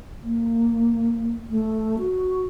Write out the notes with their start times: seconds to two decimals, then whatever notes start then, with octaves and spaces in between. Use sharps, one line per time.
0.22 A#3
1.50 A3
1.98 F#4